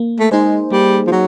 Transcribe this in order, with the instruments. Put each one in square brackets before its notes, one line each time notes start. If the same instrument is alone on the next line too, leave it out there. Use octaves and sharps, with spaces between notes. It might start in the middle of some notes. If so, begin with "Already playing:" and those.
Already playing: [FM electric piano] A#3
[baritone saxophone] A3
[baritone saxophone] G#3 [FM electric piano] D#4 G#4 C5
[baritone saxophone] G3 [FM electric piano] A#3
[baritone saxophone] F3
F#3